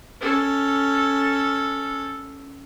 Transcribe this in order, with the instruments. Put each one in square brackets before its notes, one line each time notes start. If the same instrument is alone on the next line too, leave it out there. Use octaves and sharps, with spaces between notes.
[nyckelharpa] C#4 A4